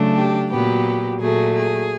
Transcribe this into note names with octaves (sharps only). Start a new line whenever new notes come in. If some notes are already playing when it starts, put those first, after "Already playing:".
Already playing: C#3 F#3 A3 D4
G4
A#2 F#3 B3 G4
A#2 F#3 A3 G#4
G#4